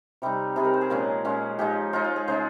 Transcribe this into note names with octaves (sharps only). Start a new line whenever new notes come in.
C3 G3 C4 D#4
C3 G3 C4 D#4 G#4
A#4
C5
G#4
A#2 F3 G#3 C#4
A#2 F3 G#3 C#4
F3 G#3 D#4 G4
F3 G#3 D#4 F4
F4
G#4
C#3 G#3 D#4 C5